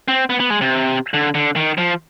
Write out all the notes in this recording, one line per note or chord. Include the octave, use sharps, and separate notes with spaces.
C4
B3
B3
G#3
C3
D3
D3
D#3
F3